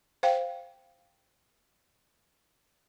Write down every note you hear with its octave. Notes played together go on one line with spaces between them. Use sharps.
C5 F5 G5